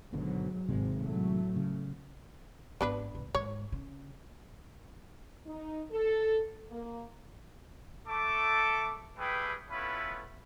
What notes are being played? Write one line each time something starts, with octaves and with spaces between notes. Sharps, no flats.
G#1 G#2 B2 D3 F#3
G#1 C3 D#3 G#3
A2 F#3 A3
C#3
G#1 B3 D4 B4
D1 C#2
G#2 C#5
C#3
D#4
A4
A#3
A3 A4 D6
G3 A3 G#4 B4 G5
A3 B3 C#4 E4 F4 B4